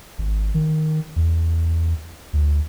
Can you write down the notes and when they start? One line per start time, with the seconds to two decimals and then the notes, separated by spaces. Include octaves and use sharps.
0.18 G#1
0.54 D#3
1.16 E2
2.33 D2